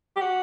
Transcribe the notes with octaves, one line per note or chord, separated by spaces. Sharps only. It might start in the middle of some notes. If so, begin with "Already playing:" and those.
G4
F#4